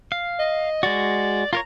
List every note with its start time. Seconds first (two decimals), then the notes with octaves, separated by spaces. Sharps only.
0.12 F5
0.39 D#5
0.83 G#3 F#4 D5
1.53 F4 A#4 C#5 A#5